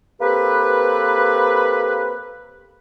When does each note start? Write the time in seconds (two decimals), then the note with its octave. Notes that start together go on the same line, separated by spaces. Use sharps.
0.21 A#3 C4 G4 A4 B4